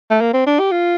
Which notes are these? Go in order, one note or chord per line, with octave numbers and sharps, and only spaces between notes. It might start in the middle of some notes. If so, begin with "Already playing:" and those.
A3
A#3
C4
D4
G4
F4